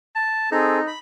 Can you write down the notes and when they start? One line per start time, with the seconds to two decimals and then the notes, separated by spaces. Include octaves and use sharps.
0.16 A5
0.52 C4 D#4 G#4 A4
0.87 B5